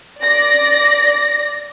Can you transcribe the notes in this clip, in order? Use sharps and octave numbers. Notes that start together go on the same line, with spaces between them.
D5 A#6